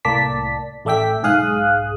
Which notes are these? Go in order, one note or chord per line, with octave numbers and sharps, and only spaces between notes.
C2 A2 A#3 D5 A5 B6
A1 A3 D5 E5 G5 B6
B1 G#2 G#4 F5 D#6 F#6